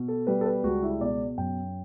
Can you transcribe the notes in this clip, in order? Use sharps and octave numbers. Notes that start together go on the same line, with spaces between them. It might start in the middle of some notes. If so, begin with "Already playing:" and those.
Already playing: B2
A4
G3 B4
A4
B4
C#2 F#4
E4
B2 D5
F#2 G5